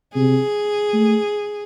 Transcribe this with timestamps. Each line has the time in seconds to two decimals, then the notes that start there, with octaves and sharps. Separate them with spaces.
0.15 C3 G#4
0.93 A3